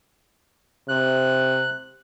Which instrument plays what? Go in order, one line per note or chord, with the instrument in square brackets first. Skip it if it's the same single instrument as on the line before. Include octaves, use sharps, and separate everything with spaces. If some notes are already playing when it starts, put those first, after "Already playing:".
[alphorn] C3 [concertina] F#6